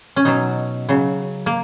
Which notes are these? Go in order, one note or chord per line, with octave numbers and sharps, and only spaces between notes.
C#4
B2 F#3 D#4
C#3 F#3
A#3